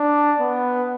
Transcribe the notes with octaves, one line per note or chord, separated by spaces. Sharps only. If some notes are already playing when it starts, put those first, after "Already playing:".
Already playing: D4
B3